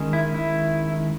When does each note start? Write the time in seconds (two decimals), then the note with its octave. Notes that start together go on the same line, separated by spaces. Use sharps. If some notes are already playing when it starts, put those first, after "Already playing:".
Already playing: D#3 G#3 C#4
0.13 E4
0.34 E4